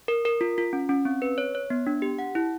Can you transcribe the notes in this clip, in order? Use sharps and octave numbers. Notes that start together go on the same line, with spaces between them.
A#4
A#4
F4
F4
C#4
C#4
C4
B4
C#5
C#5
B3
D4
G4
F#5
E4